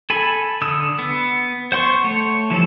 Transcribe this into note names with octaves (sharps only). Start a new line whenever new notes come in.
A4 G#5 B5
D3 D#6 E6
B3
C5 F#5 C6 C#6
A3 C#5
E3 F3 G3 A4